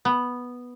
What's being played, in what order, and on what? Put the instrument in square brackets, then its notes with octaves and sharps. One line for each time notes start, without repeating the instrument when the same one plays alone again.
[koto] B3